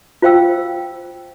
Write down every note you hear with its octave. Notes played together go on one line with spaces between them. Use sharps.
F4 C5 F5 G5 E6